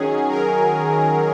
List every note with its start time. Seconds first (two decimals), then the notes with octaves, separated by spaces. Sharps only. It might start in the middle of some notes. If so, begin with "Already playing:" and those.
Already playing: D#3 F#3 C#4 G#4
0.29 A#4